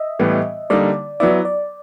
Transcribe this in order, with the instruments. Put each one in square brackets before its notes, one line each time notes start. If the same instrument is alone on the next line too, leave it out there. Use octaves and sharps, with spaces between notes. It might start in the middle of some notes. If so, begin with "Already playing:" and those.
Already playing: [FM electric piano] D#5 E5
[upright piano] A2 E3 G3 B3
[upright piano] D3 G3 A#3 D#4 [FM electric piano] D5
[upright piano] F#3 B3 E4 [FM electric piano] D5
[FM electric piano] D5